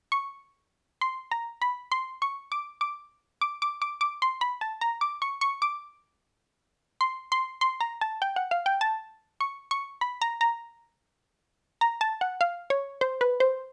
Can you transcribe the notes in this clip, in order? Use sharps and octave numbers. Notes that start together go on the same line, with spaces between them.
C#6
C6
A#5
B5
C6
C#6
D6
D6
D6
D6
D6
D6
C6
B5
A5
A#5
D6
C#6
C#6
D6
C6
C6
C6
A#5
A5
G5
F#5
F5
G5
A5
C#6
C#6
B5
A#5
A#5
A#5
A5
F#5
F5
C#5
C5
B4
C5